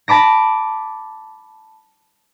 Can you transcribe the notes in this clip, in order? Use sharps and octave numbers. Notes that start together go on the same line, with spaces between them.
A5 B5 D6 A#6